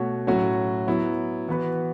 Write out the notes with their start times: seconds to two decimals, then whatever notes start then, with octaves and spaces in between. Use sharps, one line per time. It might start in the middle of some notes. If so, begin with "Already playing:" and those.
Already playing: B2 A3 F#4 C#5
0.27 A2 F#3 C#4 F#4
0.87 F#3 B3 E4
1.48 E3 B3 F#4 B4